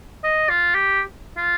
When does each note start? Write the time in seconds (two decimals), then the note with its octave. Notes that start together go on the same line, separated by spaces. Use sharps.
0.24 D#5
0.50 F4
0.75 G4
1.38 F4